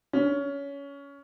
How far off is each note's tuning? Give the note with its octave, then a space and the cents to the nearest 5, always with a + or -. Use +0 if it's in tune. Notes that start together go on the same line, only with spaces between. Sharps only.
C#4 +20